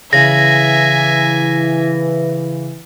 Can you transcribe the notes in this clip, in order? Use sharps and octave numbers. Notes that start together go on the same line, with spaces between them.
C#3 E3 E5 G#5 A#6